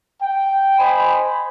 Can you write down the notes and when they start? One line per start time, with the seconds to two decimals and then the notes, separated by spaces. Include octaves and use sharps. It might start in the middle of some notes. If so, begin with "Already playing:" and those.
0.22 G5
0.78 C5 D#5 G#5 B5